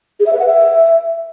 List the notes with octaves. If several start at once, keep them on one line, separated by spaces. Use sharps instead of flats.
G#4
E5
B4
F#5
E5